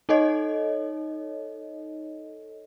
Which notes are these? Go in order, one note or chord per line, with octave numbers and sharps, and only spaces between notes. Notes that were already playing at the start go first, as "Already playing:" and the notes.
D#4 A4 C#5 D#5